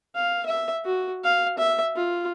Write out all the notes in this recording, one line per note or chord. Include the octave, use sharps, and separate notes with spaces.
F5
E5
F#4
F5
E5
F4